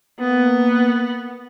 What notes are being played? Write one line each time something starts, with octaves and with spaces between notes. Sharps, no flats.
A#3 B3